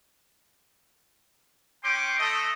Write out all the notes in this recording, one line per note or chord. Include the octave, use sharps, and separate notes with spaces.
C#4 G5 C6 D6
A3 D#5